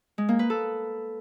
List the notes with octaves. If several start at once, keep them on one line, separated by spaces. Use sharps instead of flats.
G#3
A#3
B4
A4